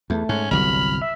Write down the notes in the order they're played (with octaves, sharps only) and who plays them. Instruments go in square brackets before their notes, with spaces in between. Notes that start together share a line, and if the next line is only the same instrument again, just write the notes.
[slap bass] E2 [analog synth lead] A3
[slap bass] G#2 [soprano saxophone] C#4
[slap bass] G1 C2 F#3 [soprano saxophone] B5 [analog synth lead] F6
[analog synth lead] E5